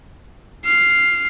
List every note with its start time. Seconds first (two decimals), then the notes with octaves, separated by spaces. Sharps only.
0.65 F6 C7